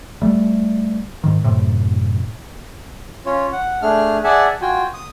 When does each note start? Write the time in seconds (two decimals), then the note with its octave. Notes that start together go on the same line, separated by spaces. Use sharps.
0.22 G3 A3
1.24 G#2 D#3
1.44 F#2 A2 C3
3.26 C#4 F4 C#5
3.52 F#5
3.82 A3 D4 G#4 F6
4.24 G#4 D5 E5 F#5 G#5 A5
4.62 F4 F#4 G5 G#5
4.94 D#6